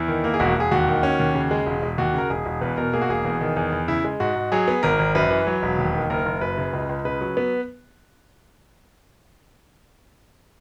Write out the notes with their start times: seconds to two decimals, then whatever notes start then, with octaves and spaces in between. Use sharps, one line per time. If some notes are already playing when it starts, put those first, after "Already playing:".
Already playing: E2 E4
0.08 D#3
0.24 A#3
0.34 G#4
0.40 E1 F#4
0.56 E1 G#4
0.71 D#2 F#4
0.88 D#3
1.03 C#4
1.20 D#2
1.35 C#3
1.51 G#3
1.66 E1
1.82 E1
1.98 D#2 F#4
2.14 C#3 A#4
2.30 E1 G#4
2.46 E1
2.61 E2 B4
2.77 B2 A#4
2.93 A#3 G#4
3.02 F#4
3.09 E1 G#4
3.25 E2
3.41 D#3
3.56 E2 G#4
3.72 E2
3.88 C#3 E4
4.05 G#3
4.20 G#2 F#4
4.36 G#2
4.52 F#3 G#4
4.68 B3
4.83 G#1 A#4
4.99 G#1
5.15 F#2 B4
5.31 E3
5.47 F#3
5.63 E1
5.79 D#2
5.95 D#3
6.10 F#1 A#4
6.26 F#1
6.41 F#2 B4
6.57 C#3
6.73 C#2
6.89 C#2
7.05 C#3 B4
7.21 F#3
7.37 B3